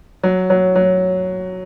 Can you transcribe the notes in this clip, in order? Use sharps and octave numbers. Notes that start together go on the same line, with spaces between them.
F#3
F#3
F#3